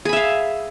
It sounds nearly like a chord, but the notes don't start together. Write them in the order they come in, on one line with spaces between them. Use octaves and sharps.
G#4 B5 E5 F5